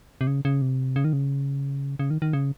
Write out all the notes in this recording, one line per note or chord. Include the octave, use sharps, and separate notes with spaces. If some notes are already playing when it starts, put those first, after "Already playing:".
C3
C#3
C#3
C3
C#3
D#3
C#3
C#3
D#3
D#3
C#3